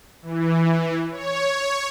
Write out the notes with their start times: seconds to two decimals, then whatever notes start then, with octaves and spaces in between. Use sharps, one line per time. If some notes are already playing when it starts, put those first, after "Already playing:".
0.22 E3
1.12 C#5